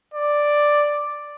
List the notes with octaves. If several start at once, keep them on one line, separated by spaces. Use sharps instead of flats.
D5